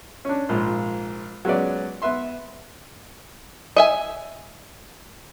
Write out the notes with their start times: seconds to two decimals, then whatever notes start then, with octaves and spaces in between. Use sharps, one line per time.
0.25 C#4 D4
0.49 A#1 G#2 F4
1.45 F#3 G#3 B3 C#4 B4 D5
2.02 B3 B4 E5 C6
3.76 D#5 E5 G#5